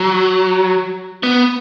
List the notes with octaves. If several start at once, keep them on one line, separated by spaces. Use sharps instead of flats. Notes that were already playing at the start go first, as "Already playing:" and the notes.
Already playing: F#3
B3